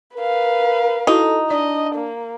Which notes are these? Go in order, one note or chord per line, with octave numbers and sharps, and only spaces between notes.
A#4 B4 F5
D#4 E4 F#4 A4
D4 D5 D#5
A#3